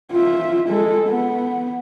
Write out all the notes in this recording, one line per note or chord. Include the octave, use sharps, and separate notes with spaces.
F4 E5
G#3 A4
B3